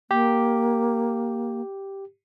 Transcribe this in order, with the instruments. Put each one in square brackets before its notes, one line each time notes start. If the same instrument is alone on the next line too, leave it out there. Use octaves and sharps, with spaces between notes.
[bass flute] A#3 [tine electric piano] G4